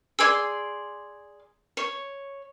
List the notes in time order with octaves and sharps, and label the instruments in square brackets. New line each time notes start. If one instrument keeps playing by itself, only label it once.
[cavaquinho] G#4 D5 C6 [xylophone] E6 G#6
[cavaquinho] C#5